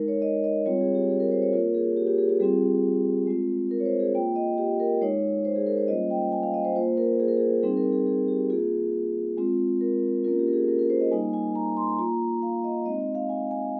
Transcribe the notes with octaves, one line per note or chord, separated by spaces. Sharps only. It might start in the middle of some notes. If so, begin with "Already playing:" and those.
Already playing: G#3 D#4 A#4
C#5
D#5
D#5
G3 C4 F4 C#5
G#4
G4
G#4
A#4
C5
C#5
A#3 F4 A#4
G#4
G4
G4
G#4
G4
G3 C4 F4 G#4
G#3 C4 F4
A#4
C#5
C5
G#4
A#3 F4 G5
D#5
G4
A#4
G#3 D#4 C#5
C5
G#4
A#4
C5
G3 A#3 C#4 F4 D#5
G5
G#5
F5
D#5
C5
A#3 F4 C5
A#4
G#4
A#4
G#4
G3 C4 D#4 G#4
A#4
G#4
G#4
G4
A#3 F4 G#4
G#3 C4 F4
A#4
A#3 C#4 F4 A#4
G4
A#4
G#4
A#4
A#4
C5
D#5
G3 A#3 D#4 G#5
G#5
A#5
C6
A#3 F4 A#5
F5
D#5
G#3 C4 D#4 D#5
D#5
F5
G#5
G#5